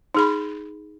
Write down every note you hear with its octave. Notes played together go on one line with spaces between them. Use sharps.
D#4 G#4 B5